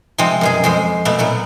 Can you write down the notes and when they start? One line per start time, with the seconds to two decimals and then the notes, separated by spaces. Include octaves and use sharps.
0.18 C3 F3 G#3 C4
0.41 F#2 B2 G#4
0.64 F2 G#3 C5
1.05 B2 A3 B3
1.19 A#2 F#3 B3